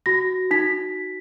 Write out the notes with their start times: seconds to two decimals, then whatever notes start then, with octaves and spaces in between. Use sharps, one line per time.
0.06 F#4 A#6
0.51 D#4 B6